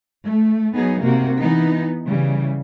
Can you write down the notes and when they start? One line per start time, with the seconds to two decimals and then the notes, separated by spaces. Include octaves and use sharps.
0.25 A3
0.74 F#3 B3 D#4 G#4
1.03 C3 A#3 F#4
1.40 E3 B3 D#4
2.07 C#3 E3 G3